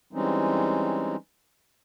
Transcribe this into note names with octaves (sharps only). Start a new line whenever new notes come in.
E3 G3 G#3 C4 C#4 D#4